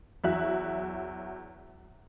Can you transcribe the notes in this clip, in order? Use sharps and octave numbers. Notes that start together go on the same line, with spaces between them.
E2 F#3 F#4 E5 F#6